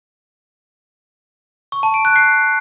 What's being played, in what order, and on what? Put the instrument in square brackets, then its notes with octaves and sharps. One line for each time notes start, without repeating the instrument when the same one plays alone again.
[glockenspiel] C#6
A5
D7
F#6
C7